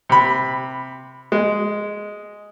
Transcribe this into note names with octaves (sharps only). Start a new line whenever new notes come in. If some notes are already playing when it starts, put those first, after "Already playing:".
C3 B5
G#3